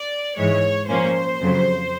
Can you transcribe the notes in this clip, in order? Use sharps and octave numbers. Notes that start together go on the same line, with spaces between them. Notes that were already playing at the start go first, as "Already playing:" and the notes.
Already playing: D5
G#2 E3 G#3 C#5
A#2 F3 A#3 C#4 C5
F2 C#3 F#3